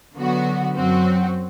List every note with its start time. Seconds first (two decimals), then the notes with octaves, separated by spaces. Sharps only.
0.15 D3 F#3 B3 F#4
0.76 F#2 F#3 C4 F#4